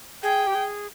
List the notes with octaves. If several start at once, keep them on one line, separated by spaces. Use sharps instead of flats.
G#4 G5
G4
G#4